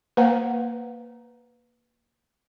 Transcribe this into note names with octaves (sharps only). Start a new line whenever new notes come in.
A#3 B4 C5 F#5 A#5